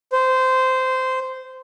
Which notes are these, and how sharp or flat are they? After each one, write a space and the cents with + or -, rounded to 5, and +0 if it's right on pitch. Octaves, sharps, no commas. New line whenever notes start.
C5 -15